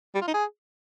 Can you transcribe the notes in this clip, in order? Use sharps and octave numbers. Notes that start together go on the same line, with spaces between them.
G3
F4
D#4
G#4